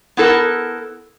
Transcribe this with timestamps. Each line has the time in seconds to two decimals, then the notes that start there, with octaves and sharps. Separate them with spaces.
0.17 B3 E4 A4 A#4